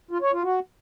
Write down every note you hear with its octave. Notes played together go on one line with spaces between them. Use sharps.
F4
C#5
F4
F#4